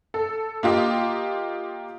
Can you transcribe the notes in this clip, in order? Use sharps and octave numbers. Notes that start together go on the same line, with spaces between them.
A4
A#3 F4 G4 D#5